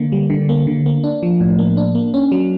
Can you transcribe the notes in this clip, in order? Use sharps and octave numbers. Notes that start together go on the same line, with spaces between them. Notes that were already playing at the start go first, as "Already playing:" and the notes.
Already playing: D3 A#3
G3
D3
A#3
D3
A#3
D4
F3
A2
A#3
D4
A#3
C#4
F#3